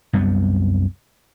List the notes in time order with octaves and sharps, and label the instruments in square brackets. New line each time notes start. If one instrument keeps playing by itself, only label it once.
[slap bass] C2 F#2 G3 B3